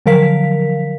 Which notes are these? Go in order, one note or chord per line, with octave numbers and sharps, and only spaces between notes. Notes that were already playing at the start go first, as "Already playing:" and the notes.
D3 F3 F#3 A#4 F5 B6